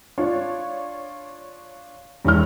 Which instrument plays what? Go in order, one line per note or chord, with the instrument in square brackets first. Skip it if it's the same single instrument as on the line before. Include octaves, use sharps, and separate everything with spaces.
[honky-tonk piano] D4 F4 C#5
[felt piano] E1 E4 F6 [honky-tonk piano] G2